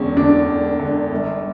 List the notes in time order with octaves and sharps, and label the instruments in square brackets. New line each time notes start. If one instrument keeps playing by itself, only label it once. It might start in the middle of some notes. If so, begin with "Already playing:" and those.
Already playing: [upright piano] E1 E2 D3 [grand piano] C#4
[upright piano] D3 [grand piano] D4
[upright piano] E1
D3
G1